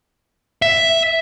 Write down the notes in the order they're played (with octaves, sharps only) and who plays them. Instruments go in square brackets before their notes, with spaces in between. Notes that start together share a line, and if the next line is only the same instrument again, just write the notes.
[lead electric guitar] E5